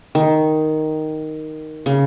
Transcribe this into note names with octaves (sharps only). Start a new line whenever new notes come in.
D#3
C#3